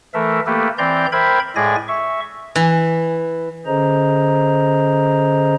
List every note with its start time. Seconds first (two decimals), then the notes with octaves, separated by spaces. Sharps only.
0.14 E3 A3 A4 A#4 E5
0.46 A3 A#3 G4 A4 B4
0.78 E3 C4 D5 A#5 C6 G6
1.12 A#4 C5 E5 G5 B5 G#6
1.56 A2 G#3 G#4 D5 G#5 A#6
1.88 E5 C#6
2.56 E3
3.66 D3 C#4 G#4 C5 D#5 A#5